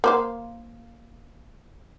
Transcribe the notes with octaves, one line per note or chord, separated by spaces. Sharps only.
A#3 C5 F5